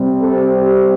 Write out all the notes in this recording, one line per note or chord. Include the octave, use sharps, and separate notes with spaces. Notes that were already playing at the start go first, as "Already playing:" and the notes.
Already playing: C3 G3 C4
A4
G4